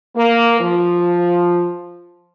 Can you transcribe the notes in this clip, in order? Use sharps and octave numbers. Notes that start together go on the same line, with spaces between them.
A#3
F3